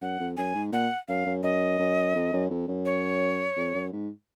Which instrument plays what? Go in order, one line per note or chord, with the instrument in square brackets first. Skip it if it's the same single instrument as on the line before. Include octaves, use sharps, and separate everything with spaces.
[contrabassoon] F#2 [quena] F#5
[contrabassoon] F2
[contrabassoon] F#2 [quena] G#5
[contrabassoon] G#2
[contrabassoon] A#2 [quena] F#5
[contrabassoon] F#2 [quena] F5
[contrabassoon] F#2
[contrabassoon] F#2 [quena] D#5
[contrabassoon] F#2
F2
F#2
F2
F#2
[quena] C#5
[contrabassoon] F2
F#2
G#2